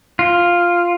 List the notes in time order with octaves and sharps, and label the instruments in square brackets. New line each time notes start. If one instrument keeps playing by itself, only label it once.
[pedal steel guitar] F4